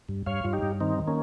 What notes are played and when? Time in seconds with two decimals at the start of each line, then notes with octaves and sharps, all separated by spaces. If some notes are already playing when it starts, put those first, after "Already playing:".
0.09 G2
0.26 G2 C#5 F5
0.44 G2 F4
0.53 D#4 G4
0.63 G2
0.80 D#3 C4 D#4
0.98 D#3
1.07 A#3 C#4